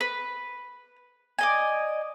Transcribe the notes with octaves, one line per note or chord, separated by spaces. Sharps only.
B4
D5 D#5 G#5